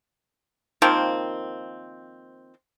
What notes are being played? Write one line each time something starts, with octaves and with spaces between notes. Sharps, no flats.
D#3 F3 A#3 C4